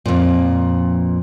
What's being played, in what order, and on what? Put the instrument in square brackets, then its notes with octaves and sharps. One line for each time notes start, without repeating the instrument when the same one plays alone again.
[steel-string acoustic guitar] F2 A#2